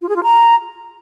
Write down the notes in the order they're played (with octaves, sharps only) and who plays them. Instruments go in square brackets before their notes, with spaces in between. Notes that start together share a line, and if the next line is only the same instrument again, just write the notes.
[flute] F4
G#4
F4
A#5